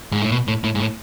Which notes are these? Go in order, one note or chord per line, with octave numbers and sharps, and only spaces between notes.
G#2
A2
B2
A2
A2
G#2
A2